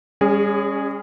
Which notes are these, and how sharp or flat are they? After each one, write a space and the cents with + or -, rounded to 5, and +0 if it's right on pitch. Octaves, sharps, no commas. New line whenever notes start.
G3 +45 C#4 +0 G#4 -5